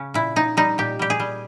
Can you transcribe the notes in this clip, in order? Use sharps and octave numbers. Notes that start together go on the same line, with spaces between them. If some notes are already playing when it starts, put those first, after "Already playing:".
Already playing: C#3 C#4
A#2 E4
A#2 D#4
G3 D#4
A#2 G4
G3 G4
G#4
G3